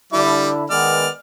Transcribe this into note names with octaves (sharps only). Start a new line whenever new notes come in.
D3 G3 D4 E4 D6
D#3 G#3 B3 D5 F6